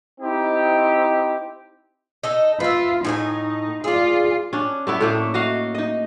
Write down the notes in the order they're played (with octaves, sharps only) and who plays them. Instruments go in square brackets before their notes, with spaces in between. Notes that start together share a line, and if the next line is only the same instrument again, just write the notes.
[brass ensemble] C4 D#4 E4 G4
[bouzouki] D#4 A4 D#5
[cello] F4 [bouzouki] B4 E5
[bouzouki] A2 F#4 G#5 [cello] D#4
[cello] F4 [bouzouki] G#4 D5
[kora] C#4 D4
A3 B3 E4
A2 A3 A#3
F#4 D#5 F5
D#4 D#5